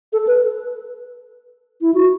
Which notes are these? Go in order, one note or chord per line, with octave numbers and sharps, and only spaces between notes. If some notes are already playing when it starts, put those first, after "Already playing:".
A4
B4
E4
F#4